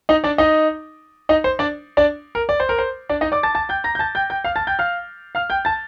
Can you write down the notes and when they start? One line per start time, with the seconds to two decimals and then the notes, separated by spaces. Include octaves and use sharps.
0.09 D#4 D#5
0.24 D4 D5
0.38 D#4 D#5
1.29 D#4 D#5
1.44 C5
1.59 D4 D5
1.97 D4 D5
2.35 A#4
2.49 D5
2.60 C5
2.69 A#4
2.78 C5
3.09 D4 D5
3.21 D#4 D#5
3.32 D5 D6
3.43 A5 A6
3.55 A5 A6
3.69 G5 G6
3.84 A#5 A#6
3.95 G6
3.99 A5 A6
4.15 G5 G6
4.30 G5 G6
4.44 F5 F6
4.56 A5 A6
4.67 G5 G6
4.79 F5 F6
5.35 F5 F6
5.50 G5 G6
5.65 A5 A6